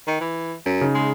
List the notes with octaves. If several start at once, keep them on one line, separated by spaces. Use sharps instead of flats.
D#3
E3
F#2
C#3 D#4
G#3